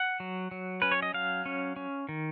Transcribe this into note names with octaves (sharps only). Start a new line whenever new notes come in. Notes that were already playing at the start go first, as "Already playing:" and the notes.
Already playing: F#5
F#3
F#3
C#4 B4
C#5
D#5
F#3 F5
C#4
C#4
D#3